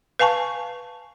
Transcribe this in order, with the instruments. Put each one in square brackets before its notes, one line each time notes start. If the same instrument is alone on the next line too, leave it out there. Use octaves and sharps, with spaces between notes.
[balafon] B4 F5 G#5 A5 C#6